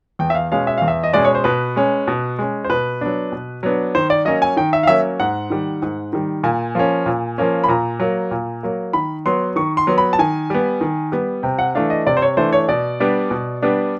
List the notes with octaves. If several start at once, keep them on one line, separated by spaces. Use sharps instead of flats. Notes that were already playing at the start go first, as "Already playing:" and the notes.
E2 G5
E5
F5
B2 G#3 C#4 F5
E5
E2 F5
E5
D#5
B2 G#3 C#4 D5
C#5
C5
B2 B4
G#3 C#4
B2
G#3 C#4
C5
B2 B4
F#3 B3 D4
B2
F#3 B3 D4
D#3 C5
D5
F#3 A#3 C#4 D#5
G#5
D#3 G5
E5
F5
F#3 A#3 C#4 E5
G#2 F#5
D#3 G3
G#2
D#3 G3
A#2 G#5
F3 A#3 C#4
A#2
F3 A#3 C#4
B5
A#2 A#5
F#3 A#3
A#2
F#3 A#3
D#3 B5
F#3 B3 C6
D#3 C#6
C6
F#3 B3
B5
A5
D#3 G#5
G3 B3
D#3
G3 B3
C3 G5
F#5
E3 A3 D4 F5
D#5
C3 D5
C5
C#5
E3 A3 D4 C5
C#5
B2 D5
G3 B3 D4
B2
G3 B3 D4